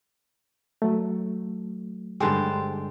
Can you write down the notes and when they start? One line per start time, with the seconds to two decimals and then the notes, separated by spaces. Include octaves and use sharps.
0.82 F#3 A3
2.20 G2 D3 G#3 G4 C5 A5